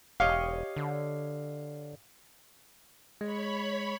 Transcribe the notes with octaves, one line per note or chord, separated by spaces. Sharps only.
E1 G4 C#5 D#5 F5
D3
G#3 C#5 B5